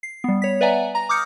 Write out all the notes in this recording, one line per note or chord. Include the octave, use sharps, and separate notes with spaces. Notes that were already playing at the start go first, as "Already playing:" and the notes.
C7
G3 B3
C#5 B6
B4 D5 E5 F#5 G#5 A#5
A#5 A#6
D6 D#6 F6 G6 C#7